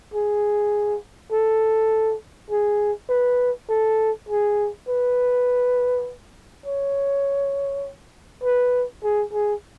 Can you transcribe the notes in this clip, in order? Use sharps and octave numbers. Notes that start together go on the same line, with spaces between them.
G#4
A4
G#4
B4
A4
G#4
B4
C#5
B4
G#4
G#4